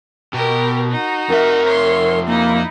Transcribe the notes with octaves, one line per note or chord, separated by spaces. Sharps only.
B2 G4 A#4
D#4 F#4
F2 A#4 E5
C#5 C6
A#3 D#4 E4